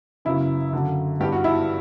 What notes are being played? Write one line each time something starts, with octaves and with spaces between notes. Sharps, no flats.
F#2 C#3 E3 E4
F#2 D3
G2 E3 G4
F#4
E4